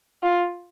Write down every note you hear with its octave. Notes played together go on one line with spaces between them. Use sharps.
F4